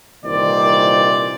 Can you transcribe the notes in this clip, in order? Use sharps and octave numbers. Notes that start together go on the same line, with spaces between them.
C2 A#2 D#3 E3 C5 D5